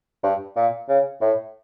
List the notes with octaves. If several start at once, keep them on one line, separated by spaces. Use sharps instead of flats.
G2
A#2
C#3
A2